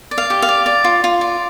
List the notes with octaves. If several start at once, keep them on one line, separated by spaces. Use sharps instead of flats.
D5
F5
G4
F5
D5
D5
F4
F4
D5